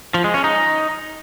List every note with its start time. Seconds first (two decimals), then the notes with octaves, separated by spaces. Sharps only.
0.14 F3
0.24 G#3
0.34 C#4
0.44 D#4